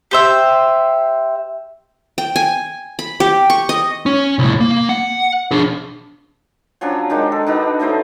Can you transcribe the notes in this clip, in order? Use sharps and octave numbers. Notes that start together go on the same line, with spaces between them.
G4 C5 E5
G5
G#5
B5
G4
C#6
D#5
C#4
C2 A2
A#3
F#5
D4 G#4
F3 F#3 C#4 D4
D#3 G#3 D4 D#4
A4
D4 D#4 F#4 B4
F#3 A3 D#4 C5